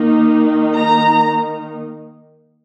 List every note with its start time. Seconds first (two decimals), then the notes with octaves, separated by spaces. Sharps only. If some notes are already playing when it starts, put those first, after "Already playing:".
Already playing: D#3 A#3 D#4
0.76 A#5